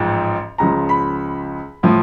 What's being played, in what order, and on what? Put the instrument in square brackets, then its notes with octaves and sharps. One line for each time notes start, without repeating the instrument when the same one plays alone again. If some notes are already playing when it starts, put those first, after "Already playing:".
Already playing: [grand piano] A1 G#2 F3
C#2 C#3 F3 A#5
B5
A2 F3